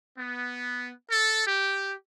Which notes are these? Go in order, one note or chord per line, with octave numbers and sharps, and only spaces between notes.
B3
A4
G4